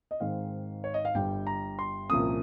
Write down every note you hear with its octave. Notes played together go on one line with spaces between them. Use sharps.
D#5
G#2 D#3 G#3 C4 F5
C#5
D#5
F5
G1 G2 G3 G5
A#5
C6
C2 A#2 F3 A#3 C#4 D#6